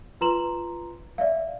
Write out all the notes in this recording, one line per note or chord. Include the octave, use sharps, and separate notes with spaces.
F4 B4 A#5 C6 E7 F#7
D5 E5 F5